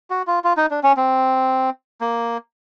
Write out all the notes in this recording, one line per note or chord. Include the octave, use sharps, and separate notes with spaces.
F#4
F4
F4
D#4
D4
C#4
C4
A#3